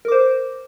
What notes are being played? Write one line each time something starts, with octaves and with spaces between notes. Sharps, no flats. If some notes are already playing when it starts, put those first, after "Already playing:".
A#4 C5 D6